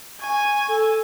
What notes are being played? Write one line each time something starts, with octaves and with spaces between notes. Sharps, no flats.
G#5 C#6
A4